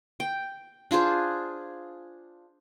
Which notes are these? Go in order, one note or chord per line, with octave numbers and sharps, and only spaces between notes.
G5
D4 F4 G#4 C5